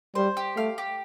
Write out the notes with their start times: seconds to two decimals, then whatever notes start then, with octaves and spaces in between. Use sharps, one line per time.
0.15 G3 C5
0.37 G4
0.56 A3 F5
0.78 G4